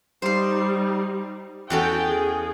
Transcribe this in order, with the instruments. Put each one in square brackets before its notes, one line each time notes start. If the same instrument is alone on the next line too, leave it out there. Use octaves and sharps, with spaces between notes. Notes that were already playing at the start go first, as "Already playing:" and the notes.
[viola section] G3 D#4 [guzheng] C5 F5
[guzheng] E2 C#4 A4 [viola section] F#4 G5
[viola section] G#4